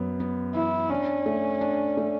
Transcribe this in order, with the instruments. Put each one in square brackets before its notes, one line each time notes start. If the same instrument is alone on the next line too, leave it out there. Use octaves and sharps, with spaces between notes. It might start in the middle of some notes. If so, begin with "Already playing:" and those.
Already playing: [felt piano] F#2 B3
B3
[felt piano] E3 [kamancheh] E4
[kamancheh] C#4 [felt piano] D4
[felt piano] A3
D4
A3